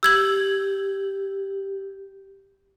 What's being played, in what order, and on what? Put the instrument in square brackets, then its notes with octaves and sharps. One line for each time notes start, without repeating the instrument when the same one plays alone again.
[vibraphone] G4 [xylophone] E6 G#6 F#7